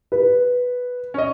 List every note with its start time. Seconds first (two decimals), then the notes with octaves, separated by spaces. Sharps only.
0.12 B4
1.14 C#4 D#5